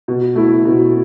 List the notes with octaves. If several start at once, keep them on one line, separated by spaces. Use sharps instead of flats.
B2
A3 E4
B2